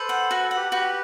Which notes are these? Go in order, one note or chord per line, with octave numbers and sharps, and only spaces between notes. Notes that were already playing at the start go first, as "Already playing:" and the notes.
Already playing: A4 B4 C5
F#5
F#4 B4
A4
F#5
G4 B4
F#4 G4 B4